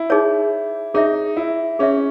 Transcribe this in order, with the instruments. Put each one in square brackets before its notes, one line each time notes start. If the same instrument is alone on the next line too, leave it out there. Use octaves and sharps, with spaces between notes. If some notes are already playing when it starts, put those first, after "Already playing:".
Already playing: [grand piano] E4
[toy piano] D#4 G#4 C#5
[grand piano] D#4 [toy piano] G#4 C#5 E5
[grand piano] E4
[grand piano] C#4 [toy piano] G#4 C#5 E5